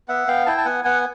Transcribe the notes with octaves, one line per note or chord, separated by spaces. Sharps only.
B3 E5 F#5
B3 F5 G5
E4 G5 A5
A5
B3 F#5 G#5
B3 F#5 G#5